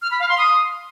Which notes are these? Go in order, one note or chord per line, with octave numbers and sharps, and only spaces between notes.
F6
B5
F5
C6
D#6